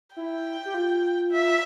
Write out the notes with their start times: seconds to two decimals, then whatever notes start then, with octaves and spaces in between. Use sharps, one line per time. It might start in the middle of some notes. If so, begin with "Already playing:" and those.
0.16 E4 G5
0.66 G4
0.74 F4
1.32 E5